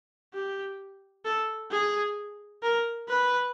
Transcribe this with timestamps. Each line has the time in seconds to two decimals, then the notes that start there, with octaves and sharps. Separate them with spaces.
0.34 G4
1.25 A4
1.71 G#4
2.63 A#4
3.08 B4